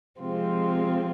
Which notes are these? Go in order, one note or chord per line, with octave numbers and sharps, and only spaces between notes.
C3 F3 G#3 C4 F4